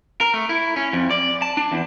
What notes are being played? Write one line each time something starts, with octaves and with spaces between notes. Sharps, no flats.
A#4
A3
E4
C#4
F2
D5
A5
D4
E2